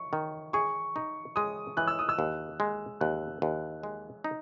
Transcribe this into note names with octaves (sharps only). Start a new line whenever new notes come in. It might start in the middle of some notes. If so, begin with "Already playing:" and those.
Already playing: C#6
D#3
G#4 C#6
D#4
G#3 D#6
E3 F#6
E6
D#6
E6
D#2
G#3
D#2 F#6
D#2
G#3
D#4